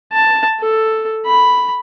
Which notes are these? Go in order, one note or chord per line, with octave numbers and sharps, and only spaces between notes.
A5
A4
B5